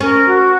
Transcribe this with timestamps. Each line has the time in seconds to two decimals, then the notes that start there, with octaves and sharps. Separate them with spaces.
0.01 C#4 A#4
0.26 F#4